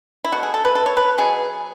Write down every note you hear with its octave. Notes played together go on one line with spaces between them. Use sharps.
E4
B2 A3 F#4
G#4
A4
B4
A4
C#5
B4
B2 F#3 B3 G#4